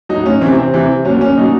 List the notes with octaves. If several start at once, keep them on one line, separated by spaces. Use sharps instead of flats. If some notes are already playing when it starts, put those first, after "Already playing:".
F#3 D#4
A2
C#4
C3 E3 C4
C4
C3 E3
A#2 F#3 C#4
C#4
A#2 F#3 D#4